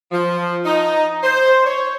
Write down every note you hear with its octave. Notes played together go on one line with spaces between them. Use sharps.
F3
D#4
C5
C#5